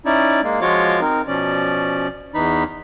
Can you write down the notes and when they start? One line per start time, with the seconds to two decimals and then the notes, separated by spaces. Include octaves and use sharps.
0.06 C#4 D#4 E4 D5
0.43 G#3 A#3
0.61 F3 G#3 F4 F#4 C#5 D6
1.01 C4 D#4 A#4
1.27 B2 F3 C#4 D5
2.34 E2 E3 D#4 B5